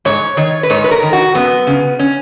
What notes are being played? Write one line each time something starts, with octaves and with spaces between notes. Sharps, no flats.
G#2 C#5
D#3 C#5
B4
G#2 C#5
B4
A#4
D#3
F#4
F#2 B3
C#3
C#4